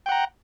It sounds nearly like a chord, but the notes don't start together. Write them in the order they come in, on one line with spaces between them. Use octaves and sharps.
G5 F#5 A#5